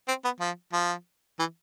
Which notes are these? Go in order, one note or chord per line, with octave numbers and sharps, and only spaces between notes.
C4
B3
F3
F3
E3